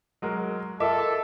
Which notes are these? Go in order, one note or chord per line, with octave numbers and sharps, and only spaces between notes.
F#3 G#3 A#4
F4 A4 A#4 D#5 E5 D6